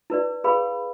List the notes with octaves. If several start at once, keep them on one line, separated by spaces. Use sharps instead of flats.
E4 B4 D5
G#4 B4 F5 B5